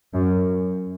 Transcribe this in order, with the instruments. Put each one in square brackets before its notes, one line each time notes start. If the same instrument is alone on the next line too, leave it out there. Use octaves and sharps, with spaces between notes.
[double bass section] F#2